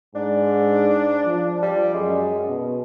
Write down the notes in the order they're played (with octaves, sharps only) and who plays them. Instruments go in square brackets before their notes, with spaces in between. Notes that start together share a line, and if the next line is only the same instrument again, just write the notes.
[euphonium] G#2 [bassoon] D4
[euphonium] F3
[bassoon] G3
[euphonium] F#2 [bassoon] G#3
[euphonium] B2